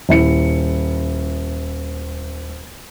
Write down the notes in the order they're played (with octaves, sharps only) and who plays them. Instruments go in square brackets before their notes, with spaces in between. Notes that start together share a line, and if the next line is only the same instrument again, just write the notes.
[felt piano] D#1 E4 C#7